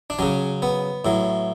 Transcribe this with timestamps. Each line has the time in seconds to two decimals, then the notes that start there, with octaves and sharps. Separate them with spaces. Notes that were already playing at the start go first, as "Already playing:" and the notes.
0.10 D4
0.19 C#3 F#3 C#4
0.62 B3
1.05 A2 F#3